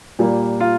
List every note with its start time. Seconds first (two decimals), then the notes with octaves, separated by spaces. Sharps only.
0.19 A#2 G3 A#3
0.60 F4